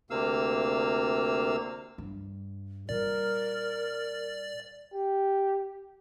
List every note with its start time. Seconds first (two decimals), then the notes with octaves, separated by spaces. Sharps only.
0.10 D2 C3 A#3 F5 E6
1.98 G2
2.89 A#2 G3 A#4 D5
4.94 G4